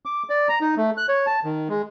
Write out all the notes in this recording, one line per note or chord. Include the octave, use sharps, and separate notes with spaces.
D6
D5
A#5
D#4
A3
F#6
C#5
A5
D#3
G#3